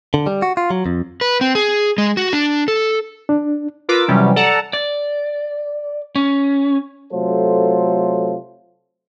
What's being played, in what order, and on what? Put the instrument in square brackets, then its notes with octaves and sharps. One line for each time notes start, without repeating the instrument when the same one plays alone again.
[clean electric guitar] D3
G3
F#4
F4
F#3
F2
[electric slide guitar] B4
C4
G#4
G#3
F#4
D4
A4
[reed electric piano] D4
[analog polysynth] F4 A#4 B4 D6 E6
C3 E3 F#3 G3 C#4
A4 D5 F#5 A5 A#5
[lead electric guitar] D5
C#4
[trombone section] C3 F#3 A3 F4 A4 C5